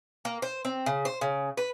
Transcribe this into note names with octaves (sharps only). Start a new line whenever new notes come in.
A#3
C5
C4
C#3
C5
C#3
B4